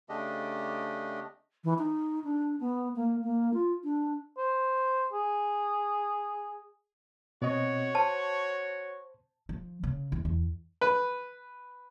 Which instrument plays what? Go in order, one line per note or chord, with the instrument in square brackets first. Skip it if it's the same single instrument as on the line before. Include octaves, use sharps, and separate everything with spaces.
[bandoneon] C#3 A3 D4 G4 D#5
[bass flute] E3
D#4
D4
B3
A#3
A#3
F4
D4
[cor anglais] C5
G#4
[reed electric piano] B2 C4 D#5 [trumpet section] F#4 C#5
[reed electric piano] C5 [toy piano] A5
[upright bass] F3
C#3
E2
E2
[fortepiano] B4